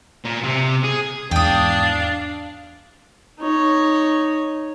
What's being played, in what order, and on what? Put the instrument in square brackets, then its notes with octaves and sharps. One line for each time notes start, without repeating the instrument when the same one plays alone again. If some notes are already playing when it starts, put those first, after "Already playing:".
[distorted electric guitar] A#2
C3
G#4
[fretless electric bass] E2 G#2 [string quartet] D4 F5 [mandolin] G5 D#6
[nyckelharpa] D#4 C#5